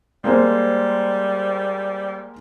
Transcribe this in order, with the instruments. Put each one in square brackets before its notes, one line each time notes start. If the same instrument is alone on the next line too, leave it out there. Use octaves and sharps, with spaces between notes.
[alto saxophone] G3 [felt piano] G#3 A#3 C5